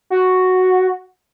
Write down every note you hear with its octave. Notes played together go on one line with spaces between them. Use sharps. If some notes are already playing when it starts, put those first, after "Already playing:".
F#4